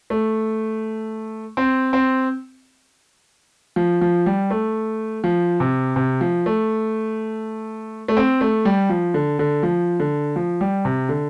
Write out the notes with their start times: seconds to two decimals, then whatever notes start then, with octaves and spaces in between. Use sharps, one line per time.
0.10 A3
1.57 C4
1.93 C4
3.76 F3
4.01 F3
4.26 G3
4.50 A3
5.24 F3
5.60 C3
5.96 C3
6.21 F3
6.46 A3
8.08 A3
8.17 C4
8.41 A3
8.65 G3
8.90 F3
9.14 D3
9.39 D3
9.63 F3
10.00 D3
10.36 F3
10.61 G3
10.85 C3
11.09 D3